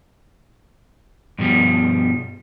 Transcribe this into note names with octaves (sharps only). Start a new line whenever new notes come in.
G2 B2 F3 G3